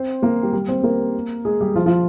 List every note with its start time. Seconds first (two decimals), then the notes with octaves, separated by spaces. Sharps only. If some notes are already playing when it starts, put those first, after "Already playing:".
Already playing: C4 C5
0.22 A#3 A#4
0.43 G3 G4
0.53 G3 G4
0.69 C4 C5
0.84 A#3 A#4
1.45 G#3 G#4
1.61 G3 G4
1.75 F3 F4
1.86 F3 F4